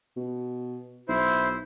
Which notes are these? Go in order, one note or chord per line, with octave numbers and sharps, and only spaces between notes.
B2
B1 E4 C5